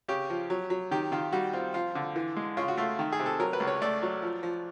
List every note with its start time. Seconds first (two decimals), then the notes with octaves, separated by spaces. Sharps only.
0.08 C#3 G4
0.30 F3
0.50 F#3
0.70 F#3
0.91 D#3 G4
1.12 D#3 F4
1.33 G3 F#4
1.53 C4 F4
1.74 F3 F4
1.95 D3
2.16 E3
2.37 G#3
2.57 C#3 F4
2.68 F#4
2.78 A3 F4
2.99 D#3
3.12 G#4
3.20 C3
3.26 A4
3.40 F#3 A#4
3.53 B4
3.60 C#2
3.67 C#5
3.82 A3 D5
4.02 F#3
4.22 F3
4.43 F3